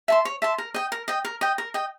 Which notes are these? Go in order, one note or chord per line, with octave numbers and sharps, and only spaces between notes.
E5 A5 C6
C#5
E5 A5 C6
A#4
D#5 G5
A#4
D#5 G5
A#4
D#5 G5
A#4
D#5 G5